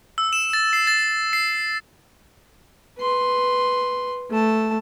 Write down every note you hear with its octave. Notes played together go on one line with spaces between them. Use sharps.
E6
E7
A6
C7
A6
C7
B4 C6
A3 A5